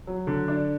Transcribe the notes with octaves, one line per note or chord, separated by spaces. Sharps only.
F#3
D3
D4